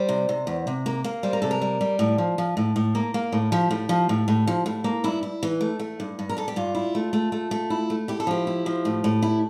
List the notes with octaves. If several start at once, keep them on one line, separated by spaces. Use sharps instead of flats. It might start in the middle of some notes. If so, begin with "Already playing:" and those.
Already playing: G3 C5
C3
C3
E2
C3
A#3
A#3
G3 C5
A#4
C3 A4
A#4
G3
G3
A2
F3
F3
A2
A2
A#3
A#3
A2
F3 G4
A2
F3
A2
A2
F3
A2
A#3
G2 E4
E4
E3
A3
A3
G2
G2
A#4
G2 A4
G4
G2 F4
E4
A3
A3
A3
A3
E4
A3
E4 G4
A4
F3 G4
E4
F3
A2
A2
E4